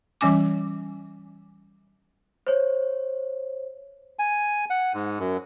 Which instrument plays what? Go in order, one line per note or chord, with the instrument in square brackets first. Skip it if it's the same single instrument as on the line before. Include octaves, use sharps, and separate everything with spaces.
[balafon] E3 G3 C#4 G#5 D6
[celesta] C5 C#5
[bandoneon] G#5
F#5
G#2
F#2